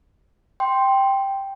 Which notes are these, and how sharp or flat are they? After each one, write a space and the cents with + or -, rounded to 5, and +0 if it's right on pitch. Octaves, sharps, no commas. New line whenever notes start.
G5 +0 C6 +0